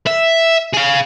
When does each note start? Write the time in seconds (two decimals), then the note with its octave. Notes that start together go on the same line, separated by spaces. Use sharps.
0.07 E5
0.74 G#4 F5